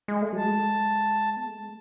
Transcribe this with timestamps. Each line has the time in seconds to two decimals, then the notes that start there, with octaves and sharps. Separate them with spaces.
0.08 G#3
0.22 A3
0.33 F#3
0.37 G#3 A5
1.37 B3
1.47 A3
1.58 G#3